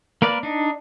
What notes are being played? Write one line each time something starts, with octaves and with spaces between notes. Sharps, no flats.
A#3 A#4 B4 D5
D4 D#4